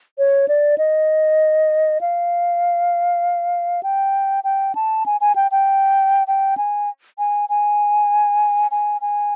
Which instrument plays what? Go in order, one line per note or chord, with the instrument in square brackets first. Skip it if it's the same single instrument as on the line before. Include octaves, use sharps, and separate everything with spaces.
[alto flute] C#5
D5
D#5
F5
G5
G5
A5
G#5
G#5
G5
G5
G5
G#5
G#5
G#5
G#5
G#5